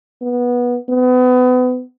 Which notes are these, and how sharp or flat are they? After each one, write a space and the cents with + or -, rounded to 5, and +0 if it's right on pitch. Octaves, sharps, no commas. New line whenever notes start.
B3 -15
B3 +30